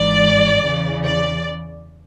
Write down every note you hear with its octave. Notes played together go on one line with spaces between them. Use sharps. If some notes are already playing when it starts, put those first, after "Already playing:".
Already playing: G#1 G#2 E3 D5
E2 C#3 E3
D5